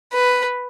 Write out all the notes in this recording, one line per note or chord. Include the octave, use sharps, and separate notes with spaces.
B4